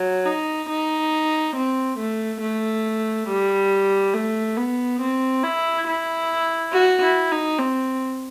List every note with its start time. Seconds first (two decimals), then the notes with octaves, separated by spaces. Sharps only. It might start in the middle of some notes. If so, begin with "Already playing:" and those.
Already playing: F#3
0.25 D#4
0.69 D#4
1.56 C4
1.99 A3
2.41 A3
3.28 G3
4.14 A3
4.57 B3
5.01 C4
5.44 E4
5.87 E4
6.73 F#4
7.02 E4
7.32 D#4
7.59 C4